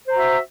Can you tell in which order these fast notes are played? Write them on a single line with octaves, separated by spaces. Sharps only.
C5 A#5 F#4 E5